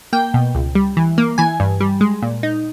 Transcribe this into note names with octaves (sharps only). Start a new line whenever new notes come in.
A#3 G5
B2
C#2
G3
E3
A#3
E3 G#5
G2
G3
G#3
A#2
D#4